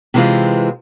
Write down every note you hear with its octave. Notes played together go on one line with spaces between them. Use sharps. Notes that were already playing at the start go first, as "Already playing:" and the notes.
C3 E3 G#3 C4 F4